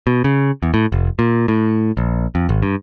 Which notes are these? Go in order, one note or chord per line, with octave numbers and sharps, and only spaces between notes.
B2
C#3
E2
A2
F1
A#2
A2
A#1
F2
G#1
G2